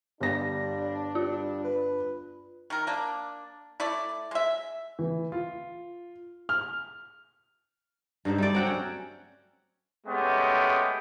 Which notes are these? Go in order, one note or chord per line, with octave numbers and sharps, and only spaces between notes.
G1 G3 D4 A#6
G3 F4
B4
D#3 A#4
A#3 D4
A3 E4 D5
G#3 E5
E3
F4
F6
G2 D3 D#4 C5
G3 A3 D5
F#3 C4 F#5 G5
C#4
G#3 A3 B3 C#4 G4